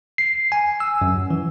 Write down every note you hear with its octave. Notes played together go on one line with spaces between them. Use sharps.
C7
G#5
E6
F#2
E3